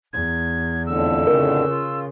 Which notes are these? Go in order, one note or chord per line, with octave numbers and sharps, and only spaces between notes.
E2 G#6
F2 A2 D3 E6
C#3 A#4
F4